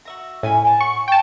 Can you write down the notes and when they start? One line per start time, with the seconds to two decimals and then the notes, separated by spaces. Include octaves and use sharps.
0.05 F#4 E5 A#5
0.43 A2 C#4 G#5 B5
0.65 G5 A5
0.80 F#5 C#6
1.08 G5 A5